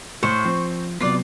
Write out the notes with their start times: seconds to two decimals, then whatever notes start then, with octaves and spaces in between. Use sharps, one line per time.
0.23 A2 C5 C#6
0.45 F3 C4
1.01 C3 F#3 B3 F4 D5 C7